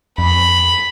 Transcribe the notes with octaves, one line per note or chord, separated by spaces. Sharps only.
F2 B5